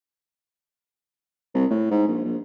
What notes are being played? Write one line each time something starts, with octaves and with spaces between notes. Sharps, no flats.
C2
A2
G#2
A#1
A#1